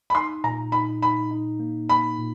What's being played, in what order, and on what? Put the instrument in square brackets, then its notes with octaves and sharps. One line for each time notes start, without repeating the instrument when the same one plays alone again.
[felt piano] B5
[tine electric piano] D#4 [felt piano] C6
[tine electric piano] A#2 [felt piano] A#5
[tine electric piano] D#4 [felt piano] B5
[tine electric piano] D#4 [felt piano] B5
[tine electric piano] D#4
A#3
[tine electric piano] A#3 [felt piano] B5
[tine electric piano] A#2